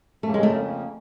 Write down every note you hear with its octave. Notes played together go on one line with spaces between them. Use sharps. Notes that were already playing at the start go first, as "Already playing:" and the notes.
F2 C#3 F3 A3 A#3 C#4
G#3
A3